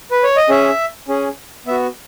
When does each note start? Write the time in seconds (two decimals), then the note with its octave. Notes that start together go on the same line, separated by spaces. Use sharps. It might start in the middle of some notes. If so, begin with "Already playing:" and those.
0.11 B4
0.24 C#5
0.36 D#5
0.49 C#4 G#4 E5
1.08 C#4 G#4
1.66 B3 E5
1.71 F#4